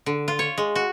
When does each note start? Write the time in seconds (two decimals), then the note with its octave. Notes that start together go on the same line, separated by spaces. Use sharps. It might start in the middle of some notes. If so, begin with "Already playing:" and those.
0.06 D3
0.28 F4
0.39 C#5
0.58 G#3
0.75 F#4